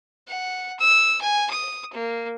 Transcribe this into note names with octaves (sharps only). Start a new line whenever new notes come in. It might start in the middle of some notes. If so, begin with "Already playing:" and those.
F#5
E6
G#5
D#6
A#3